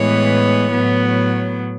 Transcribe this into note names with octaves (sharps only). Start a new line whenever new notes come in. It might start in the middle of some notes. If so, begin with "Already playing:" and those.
Already playing: A2 E3 G#3 B3 C#5
A2 F#3 B3